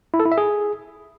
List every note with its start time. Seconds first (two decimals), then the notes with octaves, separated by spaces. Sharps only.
0.14 E4
0.20 A4
0.26 E4
0.32 E5
0.38 G#4